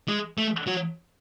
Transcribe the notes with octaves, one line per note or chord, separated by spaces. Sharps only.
G#3
A3
F#3